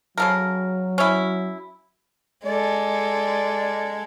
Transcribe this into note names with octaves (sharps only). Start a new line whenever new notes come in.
C#3 F#3 A4 A#4
C#4 E4
G#3 A4 D5